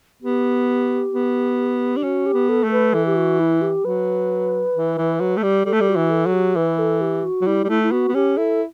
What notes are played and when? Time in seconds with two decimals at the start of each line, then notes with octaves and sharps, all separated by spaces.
0.23 B3 G4
1.13 B3
1.97 D4
2.04 C#4 F#4
2.26 G4
2.34 B3
2.49 A4
2.64 A3
2.72 B4
2.94 E3 A4
3.06 G4
3.16 F#4
3.40 E4
3.62 G4
3.84 F#3 B4
4.75 E3
4.98 E3
5.20 F#3
5.37 A3
5.43 G3
5.65 G3 A4
5.73 A3
5.81 G3
5.89 F#4
5.96 E3
6.10 A4
6.26 F#3
6.33 G4
6.56 E3 B4
6.79 A4
7.01 G4
7.24 F#4
7.42 F#3
7.46 G3 E4
7.64 G3
7.69 A3 E4
7.83 E4
7.92 B3 F#4
8.09 B3
8.14 C#4 G4
8.37 E4 A4